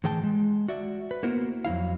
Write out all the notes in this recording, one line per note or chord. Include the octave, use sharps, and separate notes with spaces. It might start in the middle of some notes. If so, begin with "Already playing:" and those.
A2 E3 G#4 G5 A5
G#3
F#4 D5 E5
B4
A#3 B3 E4 F#4 A#4 C5
F2 F#3 E4 F5